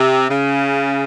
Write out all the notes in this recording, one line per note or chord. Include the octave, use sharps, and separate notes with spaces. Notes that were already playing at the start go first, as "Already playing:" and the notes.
Already playing: C3
C#3